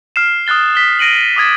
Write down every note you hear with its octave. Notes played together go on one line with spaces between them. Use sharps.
F6 C7 E7
D#6 F6 F#6 A6 G7
B6 G7
A#6 D7 D#7 F#7
D6 D#6 G#6 A6